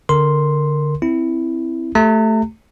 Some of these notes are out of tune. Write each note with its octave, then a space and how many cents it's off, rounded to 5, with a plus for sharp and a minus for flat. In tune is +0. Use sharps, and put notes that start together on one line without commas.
D3 -5 A#4 +0 C6 +0
C4 +0 E4 +0
A3 +0 G4 +0 A#5 -45